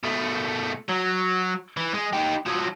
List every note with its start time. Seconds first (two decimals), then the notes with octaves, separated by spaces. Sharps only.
0.03 B2 A3
0.89 F#3
1.77 E3
1.94 G#3
2.13 D#4 G4
2.46 F3 F#3